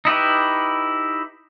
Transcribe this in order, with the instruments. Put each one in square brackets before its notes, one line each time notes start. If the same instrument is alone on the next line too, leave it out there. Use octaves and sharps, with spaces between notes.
[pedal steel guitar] D#4 E4 G4 B4